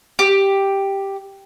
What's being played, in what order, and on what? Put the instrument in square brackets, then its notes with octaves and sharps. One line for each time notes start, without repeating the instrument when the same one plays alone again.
[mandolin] G4